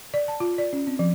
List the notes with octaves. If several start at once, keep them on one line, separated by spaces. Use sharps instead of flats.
D5
A5
F4
D5
C#4
C4
F3